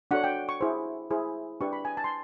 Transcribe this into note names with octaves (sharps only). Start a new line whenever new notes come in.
D4 F#4 A4 C#5 F#5
G5
C#6
E4 G#4 C5
E4 G#4 C5
D4 G4 B4 C#6
B5
G#5
A5
C6